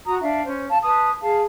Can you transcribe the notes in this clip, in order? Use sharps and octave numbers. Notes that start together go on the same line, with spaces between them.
F#4 A#5 D#6
D4 E5 F5
C#4 C5
F5 A5
B4 A5 D#6
G#4 F5 A5